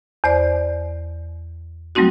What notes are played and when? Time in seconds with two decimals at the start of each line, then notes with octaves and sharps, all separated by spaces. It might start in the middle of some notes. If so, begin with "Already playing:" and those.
0.24 E2 C5 D5
1.95 F#3 G3 A3 C4 D#4 F#4